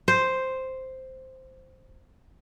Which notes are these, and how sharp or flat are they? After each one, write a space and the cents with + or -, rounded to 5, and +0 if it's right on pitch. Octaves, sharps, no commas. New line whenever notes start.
C5 +0